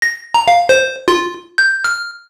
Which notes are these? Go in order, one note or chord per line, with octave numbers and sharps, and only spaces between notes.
A#6
A#5
F5
C5
F4
G6
F6